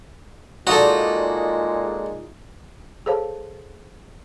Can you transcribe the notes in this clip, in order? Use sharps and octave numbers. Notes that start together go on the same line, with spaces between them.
A#2 G#3 D#4 F4 F#4 A4 D5
G#4 A4 C5 C#5 F5 A5